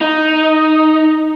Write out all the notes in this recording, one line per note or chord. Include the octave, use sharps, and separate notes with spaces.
D#4